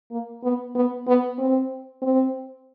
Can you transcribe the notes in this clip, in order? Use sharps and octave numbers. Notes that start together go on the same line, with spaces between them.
A#3
B3
B3
B3
C4
C4